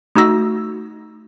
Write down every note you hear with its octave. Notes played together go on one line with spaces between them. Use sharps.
A3 D#4 F#4 E6 A#6